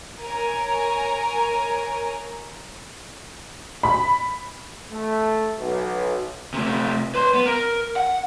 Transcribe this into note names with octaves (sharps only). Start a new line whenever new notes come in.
A#4 C#5 G#5 A#5
B5
A3
B1
C3 A3
B4 C6
B3
A#4
F#5